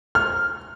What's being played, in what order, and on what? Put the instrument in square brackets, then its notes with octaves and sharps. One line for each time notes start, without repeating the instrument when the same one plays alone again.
[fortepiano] F6